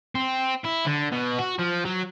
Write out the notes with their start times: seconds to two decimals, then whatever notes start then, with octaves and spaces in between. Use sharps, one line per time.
0.15 C4
0.64 E4
0.86 D3
1.12 B2
1.39 F#4
1.59 F3
1.85 F#3